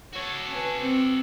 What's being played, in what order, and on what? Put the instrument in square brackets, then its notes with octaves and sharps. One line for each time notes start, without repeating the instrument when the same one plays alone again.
[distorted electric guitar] F#4 A4 [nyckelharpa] C#5
[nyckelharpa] C#4 B4
C4